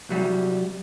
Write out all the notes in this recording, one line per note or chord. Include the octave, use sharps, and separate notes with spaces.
C2 F#3 G3